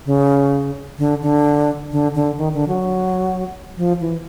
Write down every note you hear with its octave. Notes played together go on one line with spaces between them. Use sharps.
C#3
D3
D3
D3
D3
D#3
D3
F#3
F3
E3